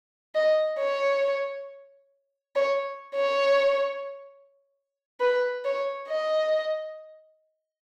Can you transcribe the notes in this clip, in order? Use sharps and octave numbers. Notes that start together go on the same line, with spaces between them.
D#5
C#5
C#5
C#5
B4
C#5
D#5